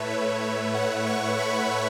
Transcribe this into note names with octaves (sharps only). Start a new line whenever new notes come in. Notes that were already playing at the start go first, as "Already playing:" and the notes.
Already playing: A2 A3 B4 C#5 E5
B4
C#5
F#5
C#6
B5